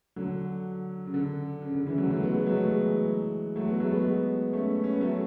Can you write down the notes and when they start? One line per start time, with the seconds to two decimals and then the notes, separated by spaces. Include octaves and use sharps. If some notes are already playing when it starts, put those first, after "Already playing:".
0.16 D3 F#3
1.06 C#3
1.14 D3
1.62 C#3
1.74 D3
1.87 C#3 E3
1.98 D3 F#3
2.10 F#3 A3
2.23 G#3 B3
2.35 G#3 B3
2.46 F#3 A3
2.59 E3 G#3
3.56 F#3 A3
3.68 G#3 B3
3.80 F#3 A3
3.92 G#3 B3
4.53 A3 C#4
4.84 C#4
4.93 B3
5.01 F#3 A3